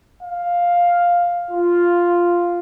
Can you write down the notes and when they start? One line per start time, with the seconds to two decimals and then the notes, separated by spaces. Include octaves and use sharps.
0.23 F5
1.51 F4